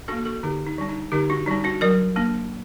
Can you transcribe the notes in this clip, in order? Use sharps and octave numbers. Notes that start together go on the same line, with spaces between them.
A#3 D4 F#4 A4
F#4 A4
D3 D#4 G4
D#4
G3 D4
D#4
D3 D#4 G4
D4 F#4
G3 D4 D#4
D4 F#4
F#3 A#4 D5
A#3 D4